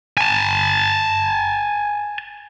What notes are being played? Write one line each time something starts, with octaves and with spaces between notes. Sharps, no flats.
G#5 A5